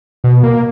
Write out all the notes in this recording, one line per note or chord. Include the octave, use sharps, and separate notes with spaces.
B2
A#3